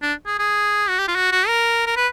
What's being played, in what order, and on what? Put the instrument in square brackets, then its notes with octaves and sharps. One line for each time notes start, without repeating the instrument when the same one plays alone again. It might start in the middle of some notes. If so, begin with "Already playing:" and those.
[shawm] D4
G#4
G#4
F#4
G4
F4
F#4
F#4
A#4
A#4
B4